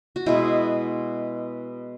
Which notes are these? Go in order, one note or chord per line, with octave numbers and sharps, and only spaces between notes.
F#4
B2 G#3 B3 E4